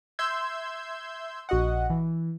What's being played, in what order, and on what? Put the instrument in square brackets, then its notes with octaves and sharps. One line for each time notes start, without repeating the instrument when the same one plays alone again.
[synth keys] E5 C6 E6 G6 G#6
A#1 F#4 D#5 F#5
E3